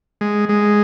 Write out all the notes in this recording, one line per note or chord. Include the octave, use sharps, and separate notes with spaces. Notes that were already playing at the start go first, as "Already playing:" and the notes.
G#3
G#3